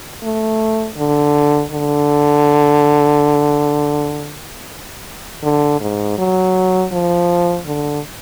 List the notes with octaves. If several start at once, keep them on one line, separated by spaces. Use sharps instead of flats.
A3
D3
D3
D3
G#2
F#3
F3
D3